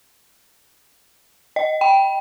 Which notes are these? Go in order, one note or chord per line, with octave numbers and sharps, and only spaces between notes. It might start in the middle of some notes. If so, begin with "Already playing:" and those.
D#5
G5